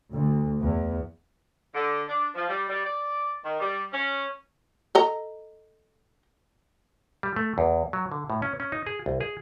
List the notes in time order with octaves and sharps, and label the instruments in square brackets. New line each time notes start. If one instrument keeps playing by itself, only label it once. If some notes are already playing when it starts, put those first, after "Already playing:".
[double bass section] D2
E2
[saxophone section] D3
D4
F3
G3
G3
D5
D#3
G3
C#4
[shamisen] A4 D#5 A#5
[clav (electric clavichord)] G3
A3
E2
F#3
D3
A2
C#4
C#4
D#4
G#4
C2
G#4